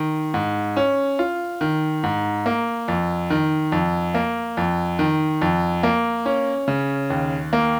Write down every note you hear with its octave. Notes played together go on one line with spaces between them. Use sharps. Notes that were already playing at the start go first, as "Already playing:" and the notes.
Already playing: D#3
G#2
C#4
F4
D#3
G#2
A#3
F2
D#3
F2
A#3
F2
D#3
F2
A#3
C#4
C#3
D#2
A#3